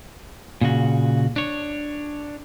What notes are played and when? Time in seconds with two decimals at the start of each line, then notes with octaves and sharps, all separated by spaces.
0.61 A#2 C#3 F#4
1.36 D4 C#5